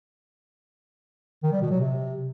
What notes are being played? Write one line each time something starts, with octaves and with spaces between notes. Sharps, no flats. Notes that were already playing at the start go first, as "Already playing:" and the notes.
D#3
G3
B2
F#3
C3